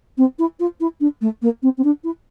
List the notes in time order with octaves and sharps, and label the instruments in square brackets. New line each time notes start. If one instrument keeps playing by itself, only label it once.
[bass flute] C4
E4
F4
E4
D4
A3
A#3
C4
C4
D4
E4